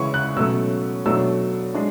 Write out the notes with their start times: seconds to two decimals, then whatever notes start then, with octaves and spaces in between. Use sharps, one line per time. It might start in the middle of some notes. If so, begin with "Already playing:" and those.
Already playing: C#3 E3 G#3 C#4 E4 C#6
0.14 F#6
0.36 B2 F#3 A3 C#4 E6
1.06 B2 F#3 A3 D4 E6
1.75 G#3 D4